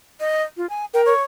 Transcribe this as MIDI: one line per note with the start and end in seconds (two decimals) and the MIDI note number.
0.20 0.43 75
0.57 0.69 65
0.70 0.85 80
0.94 1.13 70
0.94 1.01 79
1.06 1.23 73